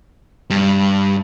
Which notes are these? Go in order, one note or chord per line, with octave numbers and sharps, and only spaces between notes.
G2